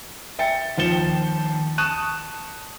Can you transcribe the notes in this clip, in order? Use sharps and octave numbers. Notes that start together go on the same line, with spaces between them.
E5 G5 A6 C#7
D#2 F3 A6 C#7 E7 G7
A5 C#6 D#6 F#6 D#7 E7